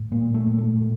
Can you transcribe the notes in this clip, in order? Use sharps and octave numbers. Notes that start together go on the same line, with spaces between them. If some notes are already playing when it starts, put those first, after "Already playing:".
Already playing: A2
A#2 A#3
A3
A#2
A3
A#2